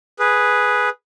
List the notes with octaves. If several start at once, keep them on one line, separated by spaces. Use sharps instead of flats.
G#4 B4